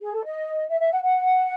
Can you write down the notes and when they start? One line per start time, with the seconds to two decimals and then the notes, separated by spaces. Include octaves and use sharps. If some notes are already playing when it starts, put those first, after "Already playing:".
0.01 G#4
0.13 A4
0.25 D#5
0.70 E5
0.80 E5
0.92 F#5
1.03 F#5